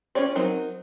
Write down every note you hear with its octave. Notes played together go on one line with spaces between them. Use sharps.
C#4 F4 F#4 C#5 D5
F#3 C4 D#4 A#4